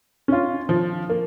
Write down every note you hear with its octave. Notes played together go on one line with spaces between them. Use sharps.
C#4 F4
F3
A#3